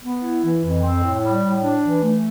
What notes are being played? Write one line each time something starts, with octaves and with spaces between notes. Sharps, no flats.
B3
E4
E3
F2
C4
A2
G3
A2
D4
E3
A3